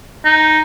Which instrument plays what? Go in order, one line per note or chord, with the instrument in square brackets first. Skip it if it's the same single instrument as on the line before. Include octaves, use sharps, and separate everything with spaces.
[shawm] D#4